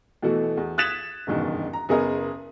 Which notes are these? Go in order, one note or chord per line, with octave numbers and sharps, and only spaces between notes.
B2 E3 A3 F#4
E2
D#6 F#6 G#6 A6 B6 E7
F#1 E2 G2 B2 D#3
A#5
F#1 B3 G#4 A#4 D#5 D#6